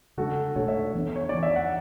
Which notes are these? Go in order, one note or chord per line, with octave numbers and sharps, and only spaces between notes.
C#3 G#3 D4 F#4 A4
B2 A3 D4 A4 C#5
C#5 E5
E3 B3 D4
C#5
E3 B3 D4 D5
E5
F#5